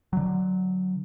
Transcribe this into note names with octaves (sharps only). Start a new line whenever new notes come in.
D3 F#3